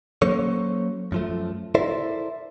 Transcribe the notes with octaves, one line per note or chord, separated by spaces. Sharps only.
F#3 A#3 C#4 A4 C5 C#5
F#2 F3 A3
E4 A4 A#4 C5 D5 E5